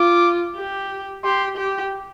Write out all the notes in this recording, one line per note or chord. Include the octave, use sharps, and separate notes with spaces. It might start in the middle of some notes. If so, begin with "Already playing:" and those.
Already playing: F4 D6
G4
G4 C6
G4